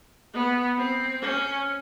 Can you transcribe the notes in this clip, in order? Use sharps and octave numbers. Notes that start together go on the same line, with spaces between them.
B3
C4
C#4